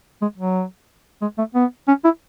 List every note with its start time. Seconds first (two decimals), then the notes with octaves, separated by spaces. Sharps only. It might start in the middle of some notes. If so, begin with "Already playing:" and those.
0.22 G#3
0.38 F#3
1.22 G#3
1.38 A3
1.55 B3
1.88 C#4
2.04 E4